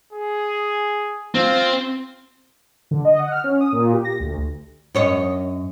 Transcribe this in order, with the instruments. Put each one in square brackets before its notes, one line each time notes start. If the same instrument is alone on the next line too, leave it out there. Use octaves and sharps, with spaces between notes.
[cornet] G#4
[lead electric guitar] C4 [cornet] F4
[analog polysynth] D3
D#5
F#5
F6
C#4
D#6
A#2
G4
A#6
D2
[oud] F#2 C#5 D#5